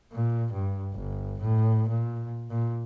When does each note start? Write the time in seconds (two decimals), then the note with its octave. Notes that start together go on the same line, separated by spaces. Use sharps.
0.12 A#2
0.53 G2
0.94 G1
1.40 A2
1.88 A#2
2.50 A#2